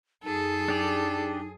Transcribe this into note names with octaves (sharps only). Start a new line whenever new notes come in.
F#2 D#4 G#4 A4
D4 G4 D5